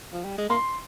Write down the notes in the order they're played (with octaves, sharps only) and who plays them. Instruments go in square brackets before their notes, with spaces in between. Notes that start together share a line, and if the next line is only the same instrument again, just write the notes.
[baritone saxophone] F3
G3
G#3
[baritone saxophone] A#3 [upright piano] C6